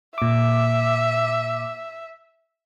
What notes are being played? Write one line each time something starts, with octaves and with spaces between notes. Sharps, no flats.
A#2 E5 D6